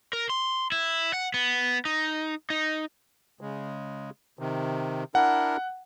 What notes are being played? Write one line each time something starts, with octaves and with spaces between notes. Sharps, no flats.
A#4
C6
E4
F#5
B3
D#4
D#4
C#3 G#3
C3 D#3
D4 E4 A#4 F#5